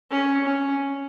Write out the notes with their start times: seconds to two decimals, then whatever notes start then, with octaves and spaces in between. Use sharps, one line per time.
0.11 C#4
0.46 C#4